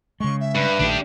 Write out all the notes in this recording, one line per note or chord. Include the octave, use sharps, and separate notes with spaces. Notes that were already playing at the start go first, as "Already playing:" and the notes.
C#3 G#3 C#6
E5
G2 B4
A#1 D#3 A3 D4 G4